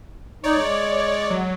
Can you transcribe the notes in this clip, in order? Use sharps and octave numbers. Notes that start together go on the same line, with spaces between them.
D#4 C#5 D5
G#3
F#3